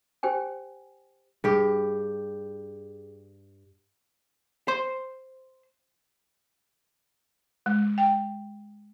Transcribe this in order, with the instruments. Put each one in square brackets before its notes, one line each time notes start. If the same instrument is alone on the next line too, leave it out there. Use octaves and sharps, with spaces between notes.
[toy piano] G4 C5 G5 G#5
[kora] G2 G4 [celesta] G#4
[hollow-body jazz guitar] C5 C6
[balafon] G#3
G5